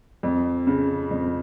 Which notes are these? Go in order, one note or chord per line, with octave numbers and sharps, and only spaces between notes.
F2
C#3
F2